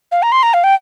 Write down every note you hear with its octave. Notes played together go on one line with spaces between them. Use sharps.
F5
A#5
C6
A#5
F5
G5